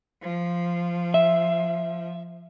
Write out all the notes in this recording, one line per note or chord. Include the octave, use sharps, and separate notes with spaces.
F3
E5